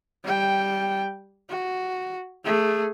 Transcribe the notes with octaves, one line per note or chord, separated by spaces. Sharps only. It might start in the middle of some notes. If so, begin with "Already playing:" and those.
G3 G5
F#4
A3 G#4